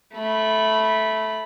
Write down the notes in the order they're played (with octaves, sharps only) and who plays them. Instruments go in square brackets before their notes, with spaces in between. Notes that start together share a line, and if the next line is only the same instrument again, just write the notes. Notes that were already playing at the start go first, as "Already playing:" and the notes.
[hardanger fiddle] A3 B5